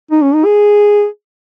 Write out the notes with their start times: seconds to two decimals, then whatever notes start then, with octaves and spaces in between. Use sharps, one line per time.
0.11 D#4
0.22 C#4
0.34 D#4
0.45 G#4